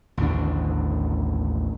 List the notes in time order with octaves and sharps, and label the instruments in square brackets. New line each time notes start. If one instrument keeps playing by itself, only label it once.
[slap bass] A1 D#2 D3 D4